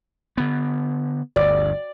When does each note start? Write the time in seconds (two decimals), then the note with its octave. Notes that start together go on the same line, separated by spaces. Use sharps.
0.38 D3 B3
1.36 G1 D2 D5